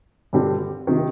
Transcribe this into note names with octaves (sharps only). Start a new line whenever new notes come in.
G2 D3 G3 C4
C3 D#3